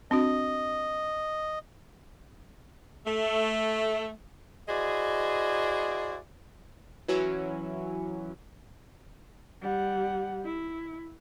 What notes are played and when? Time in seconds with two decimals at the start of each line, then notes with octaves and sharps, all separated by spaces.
0.11 C4 D4 F#4 D#5
3.05 A3
4.68 E4 F#4 G#4 C5 D5 D#5
7.08 E3 F#3 C#4 E4
9.61 G3 F#5
10.45 E4